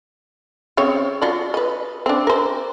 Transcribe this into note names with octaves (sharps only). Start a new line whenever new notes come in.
C#3 C4 C#5
F#3 F4 D5
B4 D#5
C4 D4
A#4 C5